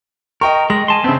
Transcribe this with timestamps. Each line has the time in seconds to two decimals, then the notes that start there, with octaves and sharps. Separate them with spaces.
0.41 A#4 D#5 G5 C#6
0.70 G#3 A#6
0.88 G#5 A5 C6
1.04 C#3 B3 C4 E5